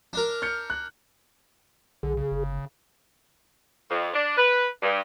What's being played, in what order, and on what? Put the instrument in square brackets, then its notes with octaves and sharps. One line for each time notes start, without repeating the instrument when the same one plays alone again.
[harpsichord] D4 A#4
[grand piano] F6 G6 C#7
F#6
[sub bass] B1 [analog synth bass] D3 [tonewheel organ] G#4
[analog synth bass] C#3
[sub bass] G1
[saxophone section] F2
D4
B4
G2